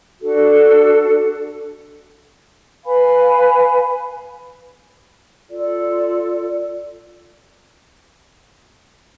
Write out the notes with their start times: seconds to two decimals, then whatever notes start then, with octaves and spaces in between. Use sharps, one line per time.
0.19 D4 F#4 A4
2.83 B4 F5 G#5 B5
5.48 F4 A4 D5